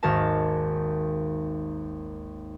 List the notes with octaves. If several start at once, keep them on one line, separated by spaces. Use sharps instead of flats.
G#1 D#2 F#4 A#4 A5